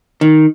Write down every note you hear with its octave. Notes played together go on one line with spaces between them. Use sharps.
D#3